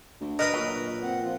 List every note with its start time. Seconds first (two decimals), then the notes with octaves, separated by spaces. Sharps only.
0.21 D2
0.39 A#4 B4 D#5 D#6
0.54 A#2 F#3
1.03 C4 F#5
1.23 F3 F4